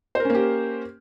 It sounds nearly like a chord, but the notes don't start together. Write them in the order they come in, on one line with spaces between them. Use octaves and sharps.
C5 A#4 C#4 A#3 G4